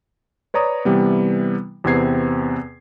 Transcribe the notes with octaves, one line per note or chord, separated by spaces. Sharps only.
B4 C#5 D5 A#5 D#6
C3 E3 G3 B3
E2 C3 B3 C4 G#6 C7